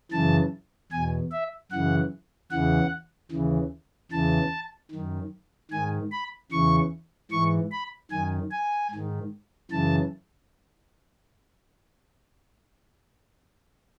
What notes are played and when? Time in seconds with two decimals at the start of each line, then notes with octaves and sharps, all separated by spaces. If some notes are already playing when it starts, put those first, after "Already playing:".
0.12 F#2 C#3 E3 A5
0.92 E2 B2 G#5
1.31 E5
1.71 F#2 C#3 E3 F#5
2.51 E2 C#3 E3 F#5
3.31 D#2 C#3 E3
4.11 E2 C#3 E3 A5
4.91 F#2 D#3
5.71 G#2 D#3 G#5
6.11 B5
6.52 E2 C#3 E3 C#6
7.31 G#2 E3 C#6
7.71 B5
8.11 F#2 D#3 G#5
8.51 G#5
8.91 G#2 D#3
9.71 F#2 C#3 E3 A5